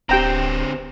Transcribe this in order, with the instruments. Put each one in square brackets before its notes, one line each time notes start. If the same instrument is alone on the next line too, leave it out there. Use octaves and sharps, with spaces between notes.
[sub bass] D1 [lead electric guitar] D3 C4 [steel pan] G4 G5 A#5